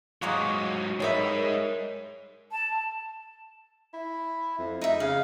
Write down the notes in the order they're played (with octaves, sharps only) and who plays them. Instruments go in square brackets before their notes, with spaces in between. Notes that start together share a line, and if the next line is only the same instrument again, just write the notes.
[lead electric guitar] G#2 F#3 [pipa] G#3 A#3 F#4
[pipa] G3 B3 E5 [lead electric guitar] G#3 D#4 [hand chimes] A#4 C#5
[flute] A5
[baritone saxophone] E4
F2
[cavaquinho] D#4 E5
[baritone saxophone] C#3 [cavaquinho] F5